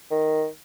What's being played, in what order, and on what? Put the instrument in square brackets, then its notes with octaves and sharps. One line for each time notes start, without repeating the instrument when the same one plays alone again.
[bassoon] D#3